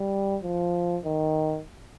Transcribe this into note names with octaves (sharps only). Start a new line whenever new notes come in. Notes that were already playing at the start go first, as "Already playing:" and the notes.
Already playing: G3
F3
D#3